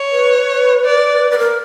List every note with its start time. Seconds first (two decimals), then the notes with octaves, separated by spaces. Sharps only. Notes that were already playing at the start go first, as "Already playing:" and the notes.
Already playing: C#5
0.12 B4
0.85 D5
1.31 B4
1.39 A#4